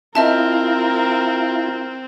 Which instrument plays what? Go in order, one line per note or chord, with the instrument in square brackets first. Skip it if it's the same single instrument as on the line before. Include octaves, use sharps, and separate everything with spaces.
[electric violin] C4 [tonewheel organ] E4 F4 [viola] A#4 [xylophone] D#5 E5 A5